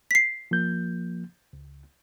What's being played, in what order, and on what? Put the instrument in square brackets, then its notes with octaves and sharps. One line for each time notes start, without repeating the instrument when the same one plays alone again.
[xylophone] B6 C7
[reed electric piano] F3 A#3 G6
C#2